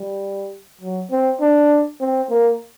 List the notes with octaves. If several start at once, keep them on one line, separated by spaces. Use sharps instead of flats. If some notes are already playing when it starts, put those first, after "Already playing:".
Already playing: G3
F#3
C4
D4
C4
A#3